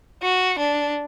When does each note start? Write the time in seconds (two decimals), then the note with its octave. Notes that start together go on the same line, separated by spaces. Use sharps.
0.22 F#4
0.59 D4